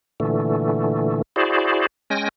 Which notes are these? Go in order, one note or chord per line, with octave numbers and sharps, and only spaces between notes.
A#2 D3 E3 A3
E4 F#4 G#4 C5 D5
G#3 C#4 G5 G#5 A#6